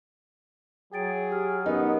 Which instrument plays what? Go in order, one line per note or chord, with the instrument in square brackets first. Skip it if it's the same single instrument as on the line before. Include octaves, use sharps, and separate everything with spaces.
[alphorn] F#3 [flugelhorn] G#4 [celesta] G5 A6 D7
[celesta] G4 F6
[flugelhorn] B3 [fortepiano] D#4 [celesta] G4 A#4